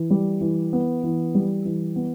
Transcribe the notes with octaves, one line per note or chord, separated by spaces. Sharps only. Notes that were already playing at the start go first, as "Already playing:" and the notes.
Already playing: E3
G3
E3
B3
E3
G3
E3
B3